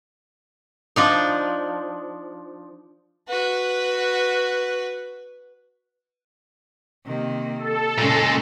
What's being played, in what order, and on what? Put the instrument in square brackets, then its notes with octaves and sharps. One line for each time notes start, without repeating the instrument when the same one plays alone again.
[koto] F3 D4 D#4
[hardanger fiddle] F#4 B4
[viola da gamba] C3 D#3 A#3
[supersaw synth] A4
[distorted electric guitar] A#2 G#3 [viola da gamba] C#3